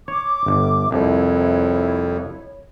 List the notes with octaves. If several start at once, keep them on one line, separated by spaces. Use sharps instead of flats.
C#5 D6
G1
C2 F2 E4 C#5